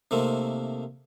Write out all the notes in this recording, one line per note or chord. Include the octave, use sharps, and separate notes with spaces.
C3 D#3 A3 A#3 C4